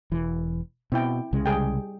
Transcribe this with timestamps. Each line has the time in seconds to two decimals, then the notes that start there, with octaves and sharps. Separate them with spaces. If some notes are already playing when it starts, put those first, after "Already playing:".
0.12 E1 E3
0.92 B2 C4 E4 G5
1.33 C2 C#3 G#3
1.46 G3 G#4 G5